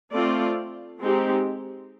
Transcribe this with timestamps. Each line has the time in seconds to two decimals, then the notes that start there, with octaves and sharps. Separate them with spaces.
0.13 A3 C4 F4 A4 D5
1.00 G#3 C4 D#4 G4